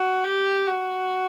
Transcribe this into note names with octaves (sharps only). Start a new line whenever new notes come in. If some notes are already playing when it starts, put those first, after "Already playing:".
Already playing: F#4
G4
F#4